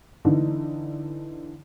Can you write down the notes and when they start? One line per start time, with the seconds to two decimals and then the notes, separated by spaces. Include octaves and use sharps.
0.25 D3 E3 D#4